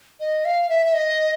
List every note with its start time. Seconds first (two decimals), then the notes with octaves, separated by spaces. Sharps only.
0.20 D#5
0.45 F5
0.69 E5
0.86 E5
0.94 D#5